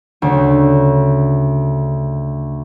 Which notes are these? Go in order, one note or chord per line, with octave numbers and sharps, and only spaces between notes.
D2 C#3